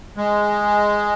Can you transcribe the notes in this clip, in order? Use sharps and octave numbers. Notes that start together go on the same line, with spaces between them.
G#3